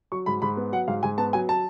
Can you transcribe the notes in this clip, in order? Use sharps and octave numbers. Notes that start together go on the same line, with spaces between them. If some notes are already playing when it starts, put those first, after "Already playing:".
F#3 C#6
G#2 B5
G#2 B5
B3
F#3 F#5
G#2 F5
G#2 G#5
B3 A5
F#3 G#5
A5